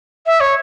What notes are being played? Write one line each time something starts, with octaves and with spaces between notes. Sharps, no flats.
E5
C#5